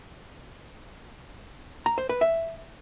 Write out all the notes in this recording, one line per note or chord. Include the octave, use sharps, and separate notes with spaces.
A#5
C5
B4
E5